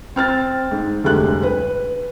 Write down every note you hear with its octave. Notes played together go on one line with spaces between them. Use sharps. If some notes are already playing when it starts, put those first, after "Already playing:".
C4 F6 A6
G#2
F1 D2 G3 G#3 F#6
B4